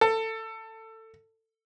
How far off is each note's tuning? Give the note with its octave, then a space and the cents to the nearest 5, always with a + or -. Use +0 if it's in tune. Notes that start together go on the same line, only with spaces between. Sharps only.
A4 +20